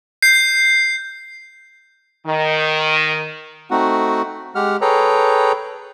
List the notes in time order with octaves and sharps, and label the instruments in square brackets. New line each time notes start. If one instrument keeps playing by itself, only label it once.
[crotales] G6 C7
[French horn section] D#3
[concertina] A3 C4 D#4 F#4 F#5
G#3 G4 F#5 F6
G#4 A4 B4 C#5 G5 A#5